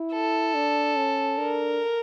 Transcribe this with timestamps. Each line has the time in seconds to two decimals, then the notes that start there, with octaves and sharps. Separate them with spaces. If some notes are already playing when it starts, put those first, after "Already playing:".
Already playing: E4
0.13 A4
0.54 D4
0.96 C#4
1.38 D4 A#4